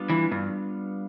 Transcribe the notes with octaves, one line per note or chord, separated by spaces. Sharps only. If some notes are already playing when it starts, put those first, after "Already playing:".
Already playing: G3 B3 D4 F4
E3
G2